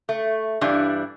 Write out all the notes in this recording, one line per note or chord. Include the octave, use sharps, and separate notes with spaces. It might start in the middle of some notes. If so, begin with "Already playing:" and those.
A3
G2 E3 G3 D4